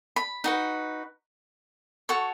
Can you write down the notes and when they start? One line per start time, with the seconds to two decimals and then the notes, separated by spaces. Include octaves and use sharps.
0.16 B5
0.44 D#4 F#4 B4
2.09 F#4 A4 C#5 C#6